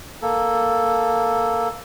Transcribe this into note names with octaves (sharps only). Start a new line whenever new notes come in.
A#3 A4